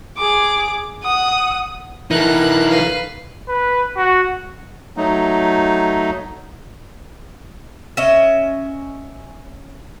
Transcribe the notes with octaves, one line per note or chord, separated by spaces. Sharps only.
G#4 D6
F#5 D#6
E3 D#4 A4 A#4 F#6
B4 F5
B4
F#4
F#3 A3 D#4
C#4 D#5 E5